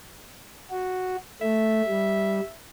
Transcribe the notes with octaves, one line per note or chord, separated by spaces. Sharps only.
F#4
A3 E5
G3